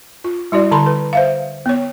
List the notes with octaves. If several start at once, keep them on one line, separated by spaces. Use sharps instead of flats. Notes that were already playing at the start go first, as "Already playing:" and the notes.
F4
G3 E4 F#4 D5
D3 A4 A5 B5 C6
B4
C5 E5 F5
B3 C#5